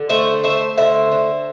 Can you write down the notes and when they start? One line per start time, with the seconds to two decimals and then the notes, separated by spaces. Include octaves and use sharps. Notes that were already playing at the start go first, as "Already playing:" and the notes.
Already playing: D3
0.09 A3 C5 E5
0.43 A3 C5 E5
0.78 D3 C5 E5
1.12 D3